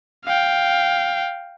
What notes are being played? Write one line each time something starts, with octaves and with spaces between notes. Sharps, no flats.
F5 G5